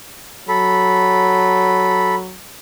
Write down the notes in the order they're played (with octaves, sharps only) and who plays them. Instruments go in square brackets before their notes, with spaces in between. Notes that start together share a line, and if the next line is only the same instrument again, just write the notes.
[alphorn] F#3 [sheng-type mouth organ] A4 B5